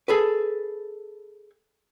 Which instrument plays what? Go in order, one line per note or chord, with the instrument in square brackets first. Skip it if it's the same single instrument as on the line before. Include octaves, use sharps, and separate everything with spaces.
[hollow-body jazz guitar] G#4 A4 B4